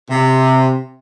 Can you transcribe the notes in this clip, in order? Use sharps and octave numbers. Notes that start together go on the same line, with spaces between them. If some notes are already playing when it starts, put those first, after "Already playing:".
C3